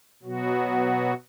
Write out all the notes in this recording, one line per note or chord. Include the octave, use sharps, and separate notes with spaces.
B2 F#3 B3 F#4